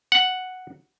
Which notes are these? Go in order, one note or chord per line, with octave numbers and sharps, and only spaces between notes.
F#5